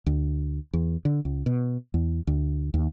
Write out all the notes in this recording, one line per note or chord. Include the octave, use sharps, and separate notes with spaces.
D2
E2
D3
C#2
B2
E2
D2
D#2